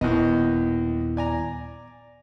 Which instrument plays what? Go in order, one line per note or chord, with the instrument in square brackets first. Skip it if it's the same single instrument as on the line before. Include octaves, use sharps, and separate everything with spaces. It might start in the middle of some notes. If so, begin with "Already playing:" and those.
[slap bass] D#1 [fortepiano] D#2 B2 D#5 [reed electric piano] B3 E4
[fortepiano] D5 G#5 A#5